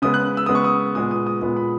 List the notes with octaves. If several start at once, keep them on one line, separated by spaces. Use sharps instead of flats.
C#3 G#3 B3 D#6
F#6
E6
C#3 G#3 B3 D#6
C#6
D#6
A#2 G#3 B3 D#6
D#6
D#6
A#2 G#3 B3
B5